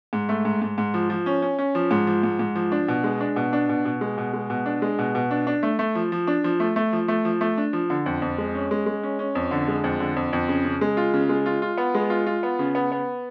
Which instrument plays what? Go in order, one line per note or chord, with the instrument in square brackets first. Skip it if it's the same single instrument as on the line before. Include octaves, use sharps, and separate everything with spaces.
[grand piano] G#2
A3
G#2
G#2
G#2
F3
F3
C#4
C#4
C#4
F3
G#2
F3
G#2
G#2
F3
D4
B2
G#3
D4
B2
D4
B2
B2
G#3
B2
G#3
B2
D4
G#3
B2
B2
D4
D4
A3
A3
F3
F3
D4
F3
A3
A3
F3
A3
F3
A3
D4
F3
D3
F2
F2
G#3
C#4
G#3
G#3
C#4
C#4
F2
D3
G#3
F2
D3
F2
F2
C#3
C#3
G#3
F4
C#3
G#3
F4
F4
B3
G#3
F4
F4
B3
C#3
B3
B3